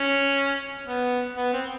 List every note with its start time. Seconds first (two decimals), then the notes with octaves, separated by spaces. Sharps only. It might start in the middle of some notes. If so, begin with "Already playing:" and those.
Already playing: C#4
0.86 B3
1.37 B3
1.53 C4